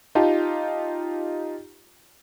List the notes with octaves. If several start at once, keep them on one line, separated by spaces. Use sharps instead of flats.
D#4 F4 G4 A5